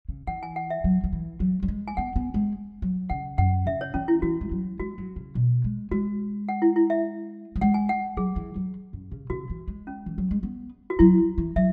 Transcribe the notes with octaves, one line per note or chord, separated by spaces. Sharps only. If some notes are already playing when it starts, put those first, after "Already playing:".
C#3
E3 F#5
G#5
F#5
E5
F#3
F#3
E3
F#3
F#3
G#3
G#5
B3 F#5
B3
G#3
F#3
C#3 F#5
F#2 F#5
C#3 E5
C#5
E3 C#4
E4
E3 F#4
G#3
F#3
G#3 F#4
F#3
C#3
B2
G#3
G#3 F#4
F#5
E4
E4
E5
F#3
G#3 F#5
G#5
F#5
F#3 G#4
E3
F#3
F#2
C#3
C#3 F#4
E3
G#3
C#4
E3
F#3
G#3
B3
F#4
F#3 E4
E3
F#3 E5